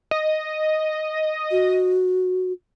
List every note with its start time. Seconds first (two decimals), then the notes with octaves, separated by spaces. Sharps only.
0.11 D#5
1.51 F#4